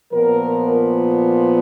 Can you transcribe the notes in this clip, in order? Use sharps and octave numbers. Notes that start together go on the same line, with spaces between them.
A#2 F3 B3 A#4